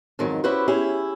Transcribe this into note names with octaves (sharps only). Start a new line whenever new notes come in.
F2 G#2 D#3 F#3
C#4 E4 F#4 G4 B4 C5
C#4 E4 G4 G#4